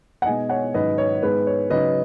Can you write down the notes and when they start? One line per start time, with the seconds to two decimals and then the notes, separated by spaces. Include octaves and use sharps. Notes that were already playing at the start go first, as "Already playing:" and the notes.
0.22 F#5
0.25 B2 G#3 B3 D#4 D#5 G#5
0.49 C#5 F#5
0.74 G#2 D#3 F#3 C#4 B4 D#5
0.98 C#5
1.22 G#2 G#3 B3 B4
1.47 C#5
1.70 C#3 F#3 D#4 B4 D#5